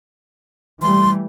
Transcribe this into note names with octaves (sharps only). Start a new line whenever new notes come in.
E3 G3 A3 C6